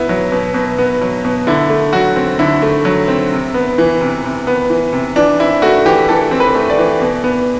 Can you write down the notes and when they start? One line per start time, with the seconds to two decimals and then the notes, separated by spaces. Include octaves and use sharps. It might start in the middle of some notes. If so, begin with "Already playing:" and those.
Already playing: B2 B3 E4
0.09 F#3
0.32 B2
0.54 B2
0.78 B3
1.01 F#3
1.25 B2
1.47 D3 E4
1.70 A3
1.93 F#3 F#4
2.16 C4
2.39 D3 E4
2.62 A3
2.85 F#3
3.08 C4
3.32 C3
3.54 B3
3.78 E3
4.01 C3
4.24 C3
4.47 B3
4.70 E3
4.93 C3
5.16 E3 D4
5.39 C4 E4
5.62 A3 F#4
5.85 E3 G4
6.09 E3 A4
6.31 C4
6.40 B4
6.55 A3
6.70 D5
6.79 E3
7.02 B2
7.24 B3